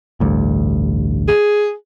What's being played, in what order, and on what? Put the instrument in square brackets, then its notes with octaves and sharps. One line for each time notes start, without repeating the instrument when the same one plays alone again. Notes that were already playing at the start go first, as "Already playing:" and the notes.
[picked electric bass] A1 D2 G2
[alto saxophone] G#4